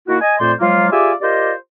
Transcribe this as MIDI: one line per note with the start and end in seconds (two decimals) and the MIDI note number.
0.08 0.19 51
0.08 0.19 58
0.08 0.19 64
0.08 0.19 66
0.21 0.36 75
0.21 0.36 80
0.39 0.53 41
0.39 0.53 46
0.39 0.53 57
0.39 0.53 72
0.39 0.53 74
0.39 0.53 84
0.60 0.90 53
0.60 0.90 54
0.60 0.90 56
0.60 0.90 58
0.60 0.90 65
0.91 1.13 65
0.91 1.13 67
0.91 1.13 68
0.91 1.13 74
0.91 1.13 76
0.91 1.13 80
1.21 1.53 65
1.21 1.53 67
1.21 1.53 70
1.21 1.53 72
1.21 1.53 74
1.21 1.53 75